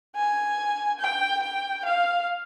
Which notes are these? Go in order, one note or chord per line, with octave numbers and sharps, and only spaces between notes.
G#5
G5
G5
F5